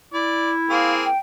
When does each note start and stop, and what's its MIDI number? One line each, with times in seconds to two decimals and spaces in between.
0.14 1.09 64
0.14 0.51 74
0.70 1.06 58
0.70 1.06 60
0.70 1.06 68
0.70 0.93 77
1.05 1.18 79